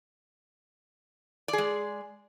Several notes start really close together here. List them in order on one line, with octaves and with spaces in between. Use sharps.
D5 G#4 G#3